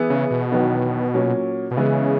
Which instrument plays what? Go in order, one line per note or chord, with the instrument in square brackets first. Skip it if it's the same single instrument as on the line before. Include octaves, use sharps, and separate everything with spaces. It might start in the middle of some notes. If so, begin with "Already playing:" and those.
Already playing: [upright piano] E3 B3 E4 G#4
[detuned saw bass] C#3
B2
[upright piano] E2 D#3 F#3 B3
A#2 F#3 C#4
[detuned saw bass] B2
[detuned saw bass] C#3 [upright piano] E3 G#3 B3 E4 G#4